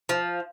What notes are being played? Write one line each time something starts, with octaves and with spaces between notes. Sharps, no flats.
F3